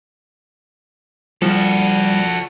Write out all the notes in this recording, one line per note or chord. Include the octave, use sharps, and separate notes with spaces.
F3 G3 F#4 A4